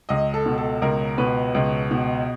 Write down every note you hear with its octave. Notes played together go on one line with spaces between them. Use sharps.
C#2 D#5
A4
B2
A4
C#2 A#4
B2 B4
C#2
B2